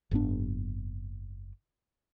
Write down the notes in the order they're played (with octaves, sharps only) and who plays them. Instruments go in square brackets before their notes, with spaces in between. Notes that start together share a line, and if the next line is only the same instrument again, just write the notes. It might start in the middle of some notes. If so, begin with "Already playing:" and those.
[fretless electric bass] F#1 G#2 B3 D4